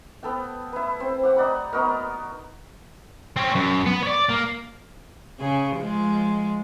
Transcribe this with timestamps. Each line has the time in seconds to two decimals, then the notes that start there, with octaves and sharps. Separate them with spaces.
0.23 B3 A4 G5
0.73 E4 B4
1.00 C4 C5
1.23 G4 F#5
1.36 D#4 D5 F#5 B5
1.73 B3 D#4 F#4 A#4
3.37 C4 C#4
3.55 F#2
3.86 B3
4.03 C#5 D5
4.30 A#3
5.40 C#3 G#4
5.76 F3 G#3